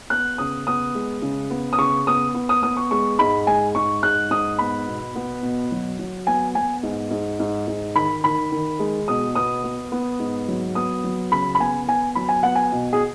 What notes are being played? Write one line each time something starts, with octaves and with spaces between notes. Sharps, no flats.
B3 F#6
C#3 D#6
B3 D#6
G#3
C#3
B3
D#6
C#3 C#6
B3 D#6
B3
D#6
B3 D#6
C#6
G#3 C#6
G#2 B5
G#3 G#5
G#2 C#6
G#2 F#6
G#2 D#6
B3 B5
B2
B3
B2
F#3
F#3
B3 G#5
B3 G#5
G#2
G#2
G#2
G#2
D#3 B5
D#3 B5
D#3
G#3
B2 D#6
B3 D#6
B3
B3
G#2
F#3
B3 D#6
F#3
C#3 B5
B5
B3 G#5
B3 G#5
F#3 B5
G#5
B3 F#5
G#5
B2
G#4